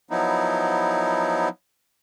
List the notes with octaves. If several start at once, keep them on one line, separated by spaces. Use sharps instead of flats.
F3 F#3 B3 D#4 E4